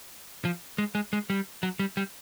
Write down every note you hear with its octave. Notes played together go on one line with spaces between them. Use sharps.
F3
G#3
G#3
G#3
G3
F#3
G3
G3